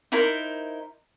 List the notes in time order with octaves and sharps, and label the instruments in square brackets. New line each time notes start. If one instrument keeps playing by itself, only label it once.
[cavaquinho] D#4 E4 A#4 C5